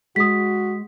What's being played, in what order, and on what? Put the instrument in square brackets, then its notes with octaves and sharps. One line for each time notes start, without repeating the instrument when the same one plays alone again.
[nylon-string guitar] G#3 [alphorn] F#4 [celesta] D#6 B6